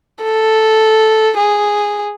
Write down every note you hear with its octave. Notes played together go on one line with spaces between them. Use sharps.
A4
G#4